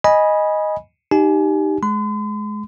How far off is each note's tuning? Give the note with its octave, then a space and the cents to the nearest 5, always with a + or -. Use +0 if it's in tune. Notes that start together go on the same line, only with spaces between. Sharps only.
D#5 +0 G#5 +0 B5 -15
D#4 -10 G4 -5 G#5 +30
G#3 +20 C6 -45